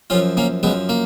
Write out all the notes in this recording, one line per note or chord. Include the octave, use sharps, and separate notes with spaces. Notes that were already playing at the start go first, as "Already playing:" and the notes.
F#2 F3 C#4 F4
A#3 C#4
F#2 F3 G#3 B3
A#3